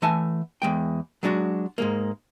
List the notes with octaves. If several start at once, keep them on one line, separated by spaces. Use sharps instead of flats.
E3 A3 F#5 G#5 A5
E2 G#3 G5
F#3 G#3 D4 F#4
G#2 G#3 A#3